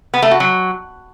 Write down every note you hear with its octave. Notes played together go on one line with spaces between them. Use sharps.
B3
A3
F#4
F#3